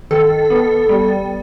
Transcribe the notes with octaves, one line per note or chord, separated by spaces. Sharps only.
D#3 A4
B3
G3